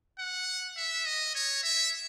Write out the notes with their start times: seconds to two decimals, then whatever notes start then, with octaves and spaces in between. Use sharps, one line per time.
0.19 F#5
0.77 E5
1.06 D#5
1.35 C#5
1.64 E5